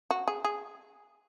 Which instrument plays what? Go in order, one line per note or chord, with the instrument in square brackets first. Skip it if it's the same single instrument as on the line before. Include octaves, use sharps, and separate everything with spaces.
[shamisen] F#4
G#4
G#4